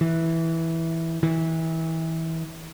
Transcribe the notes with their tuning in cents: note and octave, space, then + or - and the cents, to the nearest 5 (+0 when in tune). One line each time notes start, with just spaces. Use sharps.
E3 -10
E3 -25